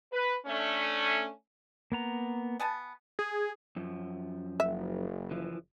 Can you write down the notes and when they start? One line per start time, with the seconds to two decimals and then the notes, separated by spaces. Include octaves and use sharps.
0.12 B4
0.46 A3 C#4 D4
1.92 A#3 B3 A#5
2.60 B3 G#5 A5
3.19 G#4
3.76 F#2 F3
4.60 F#1 E5
5.31 E3 F3